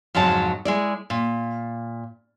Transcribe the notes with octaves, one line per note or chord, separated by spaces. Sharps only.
F2 G#2 C#3 F#3 A5
G#3 E4 D5
A#2